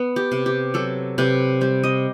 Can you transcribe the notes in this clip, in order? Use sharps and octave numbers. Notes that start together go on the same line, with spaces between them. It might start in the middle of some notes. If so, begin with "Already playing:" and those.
Already playing: B3
G4
C3
G4
F#3 A4
C3 B4
G3 C5
D#5